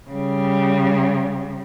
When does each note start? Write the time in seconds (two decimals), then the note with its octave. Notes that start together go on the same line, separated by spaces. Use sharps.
0.10 C#3 G3